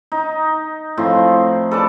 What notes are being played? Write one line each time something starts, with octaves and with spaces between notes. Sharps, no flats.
D#4
A2 F3 C4
A4 B4 D5 A5